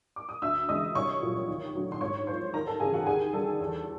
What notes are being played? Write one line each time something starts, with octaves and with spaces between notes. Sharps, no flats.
D6
D#6
D2 E5 E6
C#3 E3 G#3 D#5 D#6
C2 C#5 C#6
A#2 F#3 A3
D#2
D3 F#3 A3
C6
G#2 C#5 C#6
F3 A#3 C5 C6
D#2 A#4 A#5
A4 A5
C#3 E3 G#4 G#5
F#4 F#5
D#2 G#4 G#5
D3 G3 A4 A5
E2